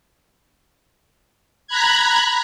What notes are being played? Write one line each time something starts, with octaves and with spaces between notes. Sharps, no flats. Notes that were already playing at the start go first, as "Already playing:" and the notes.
A#5 B5 F#6 G#6